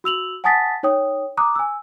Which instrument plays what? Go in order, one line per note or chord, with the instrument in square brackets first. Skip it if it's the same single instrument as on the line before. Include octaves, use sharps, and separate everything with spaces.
[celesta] F#4 E6 F7 F#7
F#5 G#5 A5 D#6 A6 B6
D#4 C#5 G5 D#6
A#5 D6 D#6 F#6
G#5 E6